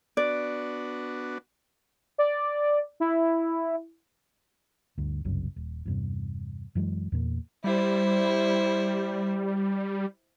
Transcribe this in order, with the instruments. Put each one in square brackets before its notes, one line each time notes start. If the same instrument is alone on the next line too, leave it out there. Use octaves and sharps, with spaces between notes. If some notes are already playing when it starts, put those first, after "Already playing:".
[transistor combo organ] B3 D4 F#4 [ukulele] D5
[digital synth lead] D5
E4
[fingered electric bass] D2 G2
G1 C2 F#2 C#3
D#1
E2 G2 C3
F#2 E3 F#3 G#3
E2 A#2 A#3
[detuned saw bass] G3 [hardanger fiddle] E4 C5